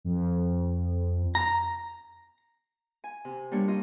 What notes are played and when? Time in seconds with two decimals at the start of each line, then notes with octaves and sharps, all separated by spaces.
0.04 F2
1.35 A#5
3.04 G#5
3.25 C3
3.52 G3 A#3 D4 C#5
3.68 F4 D#5